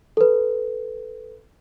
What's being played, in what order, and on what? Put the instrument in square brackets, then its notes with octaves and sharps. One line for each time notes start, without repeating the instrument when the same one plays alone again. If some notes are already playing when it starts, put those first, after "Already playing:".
[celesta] A4 B4